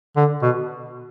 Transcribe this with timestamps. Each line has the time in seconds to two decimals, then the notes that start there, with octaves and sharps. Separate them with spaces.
0.16 D3
0.42 B2